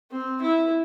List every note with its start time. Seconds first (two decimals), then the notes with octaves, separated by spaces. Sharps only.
0.11 C4
0.42 E4